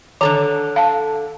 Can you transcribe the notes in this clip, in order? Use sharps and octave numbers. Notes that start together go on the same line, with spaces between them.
D3 D#3 A4 A#5
F5 A5